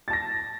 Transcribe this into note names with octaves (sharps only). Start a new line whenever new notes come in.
A5 A6 A#6